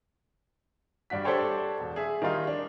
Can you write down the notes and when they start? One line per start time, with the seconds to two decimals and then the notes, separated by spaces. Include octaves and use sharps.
1.10 G2 D4 F#4 B6
1.25 D4 G4 A4 C5 C#5 G5
1.80 E1
1.96 G#4 E5
2.22 D#3 G3 D#4 F4
2.47 D4